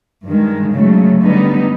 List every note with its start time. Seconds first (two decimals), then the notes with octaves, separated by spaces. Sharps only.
0.24 G2 D#3 G#3
0.71 C#3 F#3 A3
1.20 D3 G3 B3 D#4